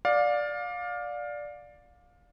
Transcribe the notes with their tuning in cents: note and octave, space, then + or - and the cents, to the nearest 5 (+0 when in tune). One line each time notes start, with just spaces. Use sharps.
D5 +0 F5 +25